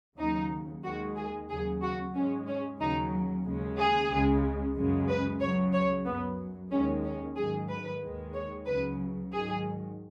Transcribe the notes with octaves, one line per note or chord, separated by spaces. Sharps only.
D#2 C#3 F#3 D#4
D#2 D#3 G#3 F#4
G#4
D#2 C#3 F#3 G#4
F#4
G#2 G#3 C#4
C#4
D#2 C#3 F#3 D#4
D#2 C#3 G#3
G#4
C#2 C#3 G#3
F#2 C#3 G#3
B4
C#2 C#3 F#3 C#5
C#5
F#2 F#3 B3
D#2 D#3 G#3 C#4
C#4
G#2 D#3 F#3 G#4
B4
D#2 D#3 G#3
C#5
C#2 C#3 F#3 B4
G#2 D#3 F#3 G#4